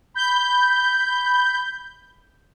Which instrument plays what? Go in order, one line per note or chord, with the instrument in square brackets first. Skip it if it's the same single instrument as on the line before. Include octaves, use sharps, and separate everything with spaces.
[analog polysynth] B5 G6